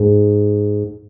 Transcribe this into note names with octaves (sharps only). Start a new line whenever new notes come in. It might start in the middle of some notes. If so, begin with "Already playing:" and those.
Already playing: G#2